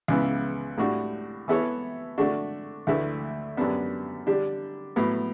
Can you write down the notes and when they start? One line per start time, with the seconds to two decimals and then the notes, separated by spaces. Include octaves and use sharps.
0.08 C#2 C#3 E3 B3
0.78 A2 G3 D4 F#4
1.48 E3 B3 E4 A4 C#5
2.18 D3 A3 D4 F#4
2.87 D2 D3 A3 E4 B4
3.57 F#2 D3 G3 B3 D4
4.27 D3 G3 D4 G4
4.96 A2 F#3 B3